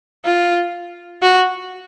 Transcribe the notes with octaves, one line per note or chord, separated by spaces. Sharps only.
F4
F#4